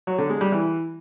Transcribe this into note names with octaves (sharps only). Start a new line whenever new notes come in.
F#3
D3
G#3
G3
E3